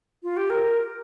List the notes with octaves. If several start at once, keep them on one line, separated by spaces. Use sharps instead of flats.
F4
G4
A#4